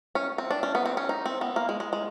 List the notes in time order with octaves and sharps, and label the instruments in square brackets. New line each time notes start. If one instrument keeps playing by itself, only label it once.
[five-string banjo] C#4
C4
D4
C#4
B3
C4
C#4
D#4
C4
B3
A#3
G#3
G#3
G#3